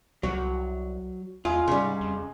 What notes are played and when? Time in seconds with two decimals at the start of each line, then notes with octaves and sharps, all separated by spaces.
0.23 C2 F#3 F#4
1.45 E2 G#3 F4
1.68 G#2 C#3 G3
2.01 F2